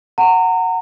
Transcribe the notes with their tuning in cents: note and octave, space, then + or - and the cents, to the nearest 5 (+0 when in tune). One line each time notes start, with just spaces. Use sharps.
F#5 +0 A#5 -30